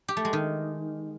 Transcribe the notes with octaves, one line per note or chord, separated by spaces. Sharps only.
G4
A3
G#3
D#3